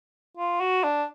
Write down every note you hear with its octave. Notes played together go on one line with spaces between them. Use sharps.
F4
F#4
D4